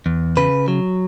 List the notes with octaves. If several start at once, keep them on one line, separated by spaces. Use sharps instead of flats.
E2
C#3 B4
F#3